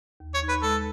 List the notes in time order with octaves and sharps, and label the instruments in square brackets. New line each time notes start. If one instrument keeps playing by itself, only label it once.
[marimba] D#2
[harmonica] C#5
[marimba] D#4
[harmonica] B4
[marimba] G#3 [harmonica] A4